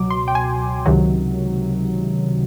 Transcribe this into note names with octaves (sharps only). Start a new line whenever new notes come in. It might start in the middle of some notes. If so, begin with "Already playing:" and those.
Already playing: C#2 B2 F#3 D6
C6
G5
G#5
C#2 C3 D#3 F#3